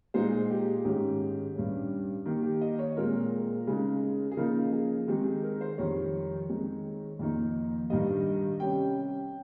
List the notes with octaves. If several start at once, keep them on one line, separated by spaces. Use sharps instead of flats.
A#2 G#3 D#4 C5
G#4
G4
G#4
G#2 D#3 G#3 C#4 G4
G2 G3 C#4
D#3 A#3 D#4 G4
G4
D#5
C#5
A#2 G#3 C4 A#4
C#3 G#3 D#4
G#4
C#3 F3 A#3 D#4 A#4
G#4
D#3 G#3 C4 D#4 G4
G#4
A#4
C5
F2 D#3 G3 C#5
D#3 G#3 C4 D#4
F2 D#3 A#3 D#4
G2 D#3 G3 D#5
C3 G3 C#4 G5